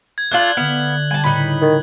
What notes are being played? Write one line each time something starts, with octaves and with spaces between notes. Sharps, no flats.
G#6
A3 D4 F4 F#6 F#7
D3 B3 E5 F5
G3 G#5 A5
A2 C#3 D#4 B4
D#3